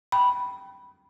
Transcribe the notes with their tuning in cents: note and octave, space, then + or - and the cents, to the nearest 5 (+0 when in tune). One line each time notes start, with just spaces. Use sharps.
G5 -10 B5 -5